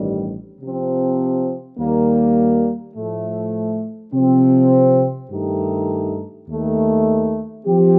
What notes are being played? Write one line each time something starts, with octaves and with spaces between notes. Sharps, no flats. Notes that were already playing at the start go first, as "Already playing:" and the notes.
Already playing: A1 G2 D#3 G3
C3 F3 C4
D#2 D#3 G3 A#3
A2 F3 A3
C3 F3 C4
G2 D#3 A3 D#4 G4
D#2 D#3 A3
F3 C4 G4